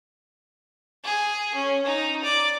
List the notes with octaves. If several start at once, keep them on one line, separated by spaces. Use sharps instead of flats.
G#4
C#4
D#4
D5